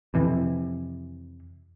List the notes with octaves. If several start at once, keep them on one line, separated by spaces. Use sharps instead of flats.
F2 C3 E3